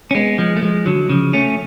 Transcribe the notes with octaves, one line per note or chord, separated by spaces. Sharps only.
C#4
G#3 B3
F3 G#3
A3
F3 G#3
D3 F#3
C#3 F3
A3 C#4